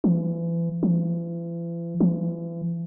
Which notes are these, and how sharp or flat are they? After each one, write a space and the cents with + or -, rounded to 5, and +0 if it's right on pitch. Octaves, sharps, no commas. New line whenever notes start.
E3 +35
E3 +45
E3 +40